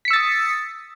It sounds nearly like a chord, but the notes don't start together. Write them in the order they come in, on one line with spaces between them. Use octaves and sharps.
B6 C#7 E6 A6 D#6